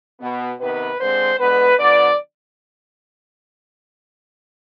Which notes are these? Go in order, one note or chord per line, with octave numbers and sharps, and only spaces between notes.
B2 B3
C3 D#3 B3 B4
D3 G#3 C4 C5
D3 G#3 B3 B4
D3 F3 B3 D5